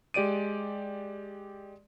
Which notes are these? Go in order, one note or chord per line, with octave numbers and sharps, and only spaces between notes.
G#3 G4 D5 D7 D#7